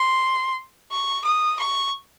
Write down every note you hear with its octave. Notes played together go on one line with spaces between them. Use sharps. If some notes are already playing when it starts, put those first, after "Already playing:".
Already playing: C6
C#6
D#6
C#6